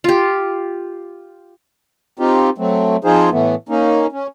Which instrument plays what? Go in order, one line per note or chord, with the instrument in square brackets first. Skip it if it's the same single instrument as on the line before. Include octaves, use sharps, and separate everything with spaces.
[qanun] F4 G4
[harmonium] C4 D#4 F4 G4
F#3 A3 C4
F3 C4 D#4 F4 G#4 C5
A2 E3 A3 B3
A#3 C#4 D#4
C#4